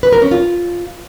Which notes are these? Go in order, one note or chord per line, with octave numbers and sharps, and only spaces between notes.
B4
A#4
C#4
F4